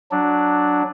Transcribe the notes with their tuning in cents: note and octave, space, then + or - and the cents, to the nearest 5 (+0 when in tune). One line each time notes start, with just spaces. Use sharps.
F#3 +0 D4 +0